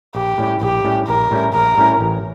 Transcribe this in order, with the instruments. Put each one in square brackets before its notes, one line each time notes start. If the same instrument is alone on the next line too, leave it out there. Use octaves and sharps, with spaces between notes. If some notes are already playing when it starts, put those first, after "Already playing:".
[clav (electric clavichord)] A#1 [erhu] G4
[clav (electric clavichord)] A2 G3 C#4 E4
[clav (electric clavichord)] A#1 [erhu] G4
[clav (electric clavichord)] A2 G3 C#4 E4
[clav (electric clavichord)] A#1 [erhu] A#4
[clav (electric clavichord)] A2 G3 C#4 E4
[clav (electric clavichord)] A#1 [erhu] A#4
[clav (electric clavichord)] A2 G3 C#4 E4
A1